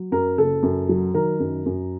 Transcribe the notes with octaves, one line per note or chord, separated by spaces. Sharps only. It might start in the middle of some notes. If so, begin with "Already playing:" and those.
Already playing: F#3
F#2 A#4
F#1 A4
F#2
F#3
D#3 A#4
F#2
F#2